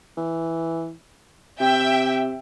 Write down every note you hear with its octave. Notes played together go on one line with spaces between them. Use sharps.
E3
C3 E5 G5